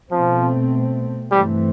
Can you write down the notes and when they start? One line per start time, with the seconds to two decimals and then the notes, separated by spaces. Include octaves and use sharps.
0.11 B2 F3 A3 C4
1.32 G2 E3 G3 A3 C4